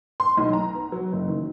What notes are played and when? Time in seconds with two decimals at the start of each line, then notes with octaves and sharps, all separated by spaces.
0.20 C6
0.37 B1
0.53 A#5
0.74 B3
0.92 F#3
1.12 F#1
1.28 D#3